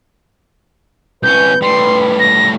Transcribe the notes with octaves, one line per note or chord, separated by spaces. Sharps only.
C2 C#4 B4 G6
A2 G3 C6
A#6